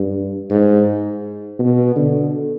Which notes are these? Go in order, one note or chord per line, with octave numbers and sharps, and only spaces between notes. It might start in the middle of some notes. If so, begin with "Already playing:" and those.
Already playing: G2
G#2
B2
D3